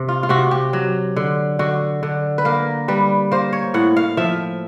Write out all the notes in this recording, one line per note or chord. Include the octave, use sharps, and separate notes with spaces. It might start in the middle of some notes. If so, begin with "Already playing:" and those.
Already playing: C3
F4
F4
C3 F#4
G4
F#3
D3
D3 F#4
D3
B4
A#3 A#4
G3 B4
A#3 C5
C#5
A2 F#5
F5
F3 E5